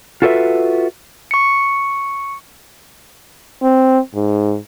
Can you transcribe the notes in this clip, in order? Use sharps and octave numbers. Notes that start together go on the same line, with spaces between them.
F4 F#4 A4 B4 C#5 E5
C#6 C#7
C4
G#2